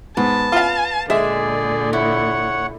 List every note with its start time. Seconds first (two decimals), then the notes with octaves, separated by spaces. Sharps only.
0.17 G#2 B3 A5
0.52 F4 F5
1.10 A#2 D3 G#3 G#4 D5 E5
1.93 E4 C#5 F#5